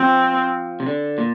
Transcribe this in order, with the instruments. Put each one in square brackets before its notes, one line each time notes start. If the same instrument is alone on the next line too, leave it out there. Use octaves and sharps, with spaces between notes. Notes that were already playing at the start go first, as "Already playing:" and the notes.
Already playing: [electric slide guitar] F3 [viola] C4
[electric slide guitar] C3
D3
A#2